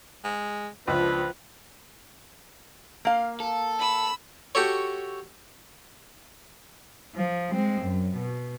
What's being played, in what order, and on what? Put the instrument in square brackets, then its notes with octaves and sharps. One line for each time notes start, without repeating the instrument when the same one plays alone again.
[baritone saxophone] G#3
[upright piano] C#2 [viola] F3 [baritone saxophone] D4 [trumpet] B4
[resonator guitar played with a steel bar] A#3 F5
[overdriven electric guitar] A4
[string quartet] B5 E6
[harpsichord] F#4 G4 A4 C#5
[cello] F3
G#3 C4
F#2
B2